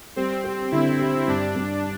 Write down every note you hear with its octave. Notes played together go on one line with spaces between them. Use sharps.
G3 C4
G4
D3 E4
G4
G2 D4
G2